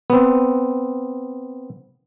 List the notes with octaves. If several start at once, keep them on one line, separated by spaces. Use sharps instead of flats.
B3 C4